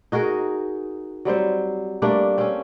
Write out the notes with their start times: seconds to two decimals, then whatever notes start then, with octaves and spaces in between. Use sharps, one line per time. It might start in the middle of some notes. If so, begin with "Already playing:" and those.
0.12 D#4 F#4 G#4 A#4
1.25 F#3 G3 C4 C5
2.02 G3 A3 A#3 D4
2.38 C4 C#4